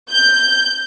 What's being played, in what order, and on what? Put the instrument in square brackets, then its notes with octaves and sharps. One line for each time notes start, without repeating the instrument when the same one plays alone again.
[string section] G6